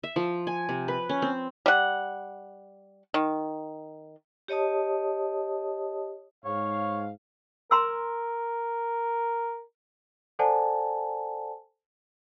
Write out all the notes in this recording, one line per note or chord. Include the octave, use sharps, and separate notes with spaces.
E5
F3
G#5
C3
B4
C#4
C4
G3 F#5
D#3
G4 C#5 D#5 A5 D#6
G#2 C#5 F5
A#4 A#5 C6 E6
A4 C5 D5 F#5 G#5 A5